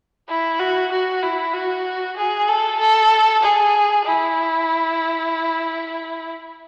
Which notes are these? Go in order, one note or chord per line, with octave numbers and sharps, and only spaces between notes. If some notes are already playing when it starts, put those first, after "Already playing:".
E4
F#4
F#4
E4
F#4
G#4
A4
A4
G#4
E4